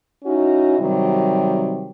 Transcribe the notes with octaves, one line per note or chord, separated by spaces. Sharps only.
C#4 D#4 E4 F#4
C3 D#3 F#3 G3